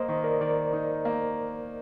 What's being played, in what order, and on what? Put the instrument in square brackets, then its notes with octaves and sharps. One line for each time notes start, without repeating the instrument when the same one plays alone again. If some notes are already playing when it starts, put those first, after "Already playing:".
Already playing: [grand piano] A#3 [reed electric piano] C5 D#5
[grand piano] D#3
[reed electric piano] A#4 D5
[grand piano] D#3 [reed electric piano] A#4 D5
[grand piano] D#4
A#3